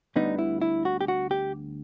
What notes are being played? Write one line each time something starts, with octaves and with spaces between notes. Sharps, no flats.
D2 D3 G3 B3 D#4
E4
E4
F#4
G4
F#4
G4